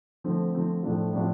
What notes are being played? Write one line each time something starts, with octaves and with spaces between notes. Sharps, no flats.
D3 F3 A3 C4
D3 F3 A3 C4
A2 F3 A3 D4 F4
A2 F3 A3 D4 F4